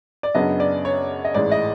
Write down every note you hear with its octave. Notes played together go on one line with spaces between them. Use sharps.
D5
F#2 C#3 F#3 B3 D4 D#5
D5
C#5
D#5
A1 G#2 E3 G#3 D5
D#5